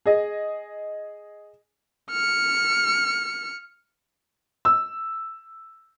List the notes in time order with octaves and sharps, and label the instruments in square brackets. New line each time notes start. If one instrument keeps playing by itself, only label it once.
[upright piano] G#4 D#5
[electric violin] F6 C#7
[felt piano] E6